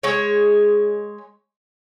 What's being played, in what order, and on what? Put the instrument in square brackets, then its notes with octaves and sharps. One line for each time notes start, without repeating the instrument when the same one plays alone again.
[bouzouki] G#3 C#5